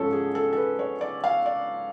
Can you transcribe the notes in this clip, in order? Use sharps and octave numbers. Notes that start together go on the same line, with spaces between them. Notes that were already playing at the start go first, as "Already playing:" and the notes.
Already playing: G#2 F3 C#4 A4
G#4
A4
A4
B4
C#5
D5
F5
D5